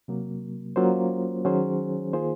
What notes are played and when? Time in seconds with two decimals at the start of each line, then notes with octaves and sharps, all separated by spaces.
0.08 C3 F#3 A#3
0.76 F#3 A#3 C#4 F4 C5
1.45 D#3 F#3 C#4 G#4 C5
2.13 D#3 A#3 F4 G#4 C5